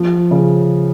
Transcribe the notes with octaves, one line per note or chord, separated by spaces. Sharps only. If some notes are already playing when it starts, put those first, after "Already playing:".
Already playing: F3
C#3